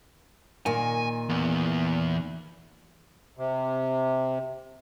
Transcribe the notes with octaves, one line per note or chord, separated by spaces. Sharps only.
A#2 D#3 G#5
E3 B3
C3